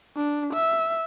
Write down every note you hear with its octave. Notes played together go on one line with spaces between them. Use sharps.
D4
E5